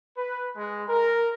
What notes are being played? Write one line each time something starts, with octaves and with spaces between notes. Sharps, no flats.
B4
G#3
A#4